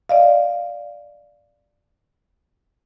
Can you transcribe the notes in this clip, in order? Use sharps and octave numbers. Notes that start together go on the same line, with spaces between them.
D5 D#5 F5